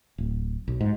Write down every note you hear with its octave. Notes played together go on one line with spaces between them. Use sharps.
D1
B1
G#2